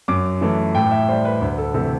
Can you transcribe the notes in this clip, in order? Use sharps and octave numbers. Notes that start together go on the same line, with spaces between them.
F#2 D6
E3 A3
A2 G5
E5
G3 C5
B4
D2
A4
C3 E3 A3 A4